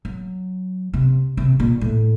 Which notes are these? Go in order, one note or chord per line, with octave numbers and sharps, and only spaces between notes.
F#3
C3
C3
A#2
A2